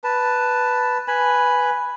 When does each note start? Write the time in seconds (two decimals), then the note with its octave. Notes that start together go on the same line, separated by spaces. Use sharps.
0.04 B4 A5
1.08 B4 G#5 B5